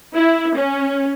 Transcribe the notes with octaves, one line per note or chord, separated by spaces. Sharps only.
E4
C#4